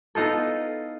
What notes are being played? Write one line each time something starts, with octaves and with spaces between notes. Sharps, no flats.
B3 D#4 F4 A4